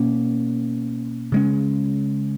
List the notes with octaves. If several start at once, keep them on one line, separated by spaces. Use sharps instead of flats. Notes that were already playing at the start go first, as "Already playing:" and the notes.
Already playing: B2 A#3 C#4
C#3 G#3 C#4